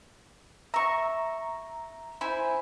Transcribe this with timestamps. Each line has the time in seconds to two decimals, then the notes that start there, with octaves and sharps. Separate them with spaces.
0.74 E5 A#5 C#6
2.21 E4 C5 G#5